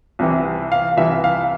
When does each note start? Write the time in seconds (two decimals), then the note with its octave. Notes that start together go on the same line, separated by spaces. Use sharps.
0.19 C2 C3 E3
0.72 F5
0.97 C2 C3 E3 E5
1.24 F5